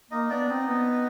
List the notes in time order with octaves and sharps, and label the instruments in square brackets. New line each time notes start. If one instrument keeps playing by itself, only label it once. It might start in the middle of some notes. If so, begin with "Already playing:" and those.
[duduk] A#3 [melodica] D#4 D#5
[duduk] B3 [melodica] D4 D5
[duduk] C4 [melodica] D#4 D#5
[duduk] B3